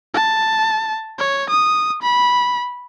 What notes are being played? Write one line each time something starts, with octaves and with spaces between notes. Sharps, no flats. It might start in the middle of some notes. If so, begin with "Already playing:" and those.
A5
C#5
D#6
B5